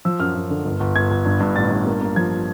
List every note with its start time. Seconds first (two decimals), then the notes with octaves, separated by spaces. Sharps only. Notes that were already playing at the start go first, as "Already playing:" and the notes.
0.05 F3 E6
0.20 F#2 F6
0.35 F#2
0.50 D3
0.65 G1
0.80 G1
0.96 G1 G#6
1.11 G1
1.26 G2
1.40 G2
1.56 A1 A6
1.71 G2
1.86 A#3
2.01 A#3
2.16 F3 G#6